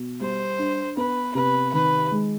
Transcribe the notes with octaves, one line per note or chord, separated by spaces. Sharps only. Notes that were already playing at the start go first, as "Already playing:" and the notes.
Already playing: B2
G3 C5
D4
B3 B4
C3 B4
D#3 B4
G#3